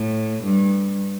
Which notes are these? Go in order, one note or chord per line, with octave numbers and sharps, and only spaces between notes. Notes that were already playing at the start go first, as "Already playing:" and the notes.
Already playing: A2
G2